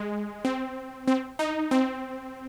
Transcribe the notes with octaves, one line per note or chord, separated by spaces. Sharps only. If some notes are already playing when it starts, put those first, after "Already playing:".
Already playing: G#3
C4
C4
D#4
C4